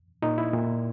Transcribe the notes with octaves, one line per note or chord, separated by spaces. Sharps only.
A#2 D#4
E4
A#2